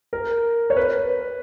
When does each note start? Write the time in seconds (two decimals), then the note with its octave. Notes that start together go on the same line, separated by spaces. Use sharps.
0.13 A#4
0.70 C#5
0.77 B4